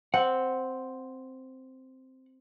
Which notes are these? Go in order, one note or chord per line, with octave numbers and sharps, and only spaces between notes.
C4 F#5